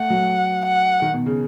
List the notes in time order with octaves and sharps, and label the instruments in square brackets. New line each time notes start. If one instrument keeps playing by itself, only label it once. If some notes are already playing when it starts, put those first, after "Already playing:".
Already playing: [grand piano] A3 [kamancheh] F#5
[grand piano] F#3
[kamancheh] F#5
[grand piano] D#3
B2
C#3